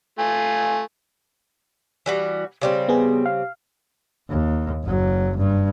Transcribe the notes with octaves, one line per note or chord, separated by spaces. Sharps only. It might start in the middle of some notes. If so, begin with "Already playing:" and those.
A3 F4 G#5
E3 G3 F#4
C#3 G3 C4
B3 G#4
F5
D#2
F#1 F#3
G2